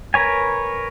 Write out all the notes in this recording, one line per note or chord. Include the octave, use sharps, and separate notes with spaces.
A#4 B4 C#5 G#5